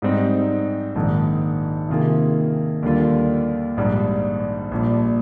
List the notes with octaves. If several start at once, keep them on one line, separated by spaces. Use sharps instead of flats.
G#2 G3 C4 D#4
A#1 G#2 D#3
C3 D#3 A#3 F4 G#4
D#2 D3 G3 A#3 F4
A#1 G#2 G3
A#1 A#2 G3